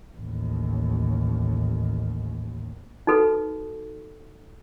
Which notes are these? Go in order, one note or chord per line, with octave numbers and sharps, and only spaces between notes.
A1 D#2
D#4 F#4 A4 B4